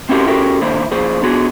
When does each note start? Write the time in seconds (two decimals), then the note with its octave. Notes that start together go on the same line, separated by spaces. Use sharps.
0.09 C4 C#4 E4 F#4 G4 A#4
0.27 C#4 F#4 G4 A4 A#4
0.61 D3 D#3 A#3 E4 C5
0.91 F3 A#3 G#4 C5
1.22 D3 B3 F#4 G#4